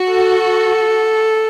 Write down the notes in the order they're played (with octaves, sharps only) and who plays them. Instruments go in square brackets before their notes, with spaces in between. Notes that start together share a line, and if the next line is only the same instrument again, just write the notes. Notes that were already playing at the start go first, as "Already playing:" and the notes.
Already playing: [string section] F#4
[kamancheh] A4